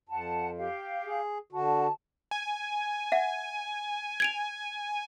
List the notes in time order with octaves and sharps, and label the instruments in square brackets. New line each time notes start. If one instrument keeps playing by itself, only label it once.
[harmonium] F2 [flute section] F#5 A5
[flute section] G4 F5
[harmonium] G#4
[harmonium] D3 F#4 [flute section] A5
[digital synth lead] G#5
[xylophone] E5 F#5
G#6 D7 F7